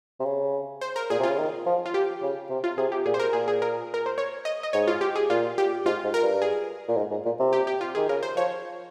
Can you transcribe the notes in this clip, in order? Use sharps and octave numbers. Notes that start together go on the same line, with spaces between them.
C3
C#3
C5
A#4
A#2 G#4
C3
F4
C#3
D#3
F3
F4
G4
C#3
C3
F4
C3 G#4
G4
A#2 G#4
C5
A#4
A#2 G#4
G#4
A#4
A#4
C5
C#5
D#5
D#5
G#2 C#5
F4
G4
G#4
A#2 F4
G4
G#2 F4
G#2
A#4
G2
G#4
A#2
G#2
G#2
A#2
C3
G4
G4
F4
D#3 G#4
C#3 A#4
C5
F3 C#5